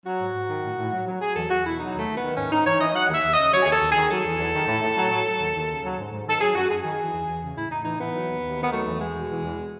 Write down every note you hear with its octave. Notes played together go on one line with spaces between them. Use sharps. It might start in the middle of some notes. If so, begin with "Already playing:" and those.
F#3 F#4
G#2
G#2
D#3
A2
A2
F#3
F#3
F#3 G#4
E2 A4
E2 F#4
B2 E4
F#3 D#4
D#2 A3
D#2
B3
D#3
G#2 C#4
G#2 D#4
E3 C#5
E3 D#5
F#3 F#5
D#2
E5
D#2
C#3 D#5
F#3 C#5
D#2 G#4
A4
D#2
G#4
D#3
F#3 A4
E2
E2
D#3
A2
A2
F#3
F#3
F#3
D#2
D#2
C#3
F#3
G#2
G#2
D#3 A4
F#3 G#4
F#2 F#4
F#2 G#4
D#3 G#4
E3
E2
E2
C#3
A2 E4
A2 D#4
E3 D#4
E3 B3
F#3
D#2
D#2
D#3
B3
F#3 A3
E2
E2 G#3
B2
E3
E2